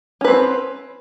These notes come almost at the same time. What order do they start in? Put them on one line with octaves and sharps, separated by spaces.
C#4 B4 C4